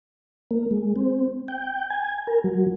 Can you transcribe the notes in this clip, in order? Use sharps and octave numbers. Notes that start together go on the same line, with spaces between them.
A#3
G#3
C4
G5
G#5
A#4
F#3